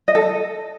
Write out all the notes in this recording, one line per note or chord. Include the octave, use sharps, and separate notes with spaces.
D#5
A4
D#5